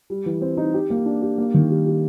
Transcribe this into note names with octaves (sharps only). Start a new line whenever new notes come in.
G3
E3
C4
D#4
G4
A#3
D4
G4
A#3
D#3
G3
G3